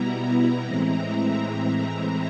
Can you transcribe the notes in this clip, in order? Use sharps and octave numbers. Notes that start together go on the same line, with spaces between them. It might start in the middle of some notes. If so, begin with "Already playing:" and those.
Already playing: B2 G3 B3 E4 A#5
A2 E3 G#3 C4 E4